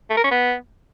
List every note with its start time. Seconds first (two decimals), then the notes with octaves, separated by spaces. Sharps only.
0.10 A3
0.17 A#4
0.24 C#4
0.31 B3